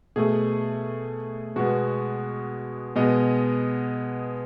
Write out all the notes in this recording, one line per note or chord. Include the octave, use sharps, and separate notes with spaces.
B2 A3 G#4
B2 G#3 B3 F#4
B2 G#3 B3 D#5